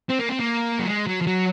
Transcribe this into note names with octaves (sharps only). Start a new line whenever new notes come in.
C4
A#3
C4
A#3
F#3
G#3
F#3
F3
F#3